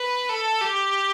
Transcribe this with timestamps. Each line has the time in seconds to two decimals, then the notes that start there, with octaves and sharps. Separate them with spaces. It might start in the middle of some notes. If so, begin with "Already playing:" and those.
Already playing: B4
0.29 A4
0.61 G4